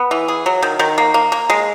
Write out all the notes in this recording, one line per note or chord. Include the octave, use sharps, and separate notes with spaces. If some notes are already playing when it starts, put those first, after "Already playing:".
Already playing: B3
E3
G#4
F#3
D#3
D#3
A#3
A#3
A#3
G#3